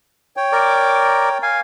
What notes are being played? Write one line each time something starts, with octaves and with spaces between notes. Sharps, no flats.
C#5 G5
A#4 D5 D6
F5 G#5